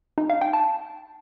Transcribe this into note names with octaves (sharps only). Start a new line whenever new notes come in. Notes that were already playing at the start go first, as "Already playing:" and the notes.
D#4
F5
G5
A5